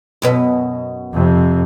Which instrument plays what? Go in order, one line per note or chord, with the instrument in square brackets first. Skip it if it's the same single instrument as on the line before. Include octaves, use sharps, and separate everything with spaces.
[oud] F#2 B2 B4
[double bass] F2 C3